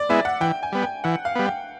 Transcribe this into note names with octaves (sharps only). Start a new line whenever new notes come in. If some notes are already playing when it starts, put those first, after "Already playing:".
Already playing: D5
G#3 B3 E4 E5
F#5
E3 G5
G#5
G3 B3
G5
E3 F#5
F5
G3 B3
G5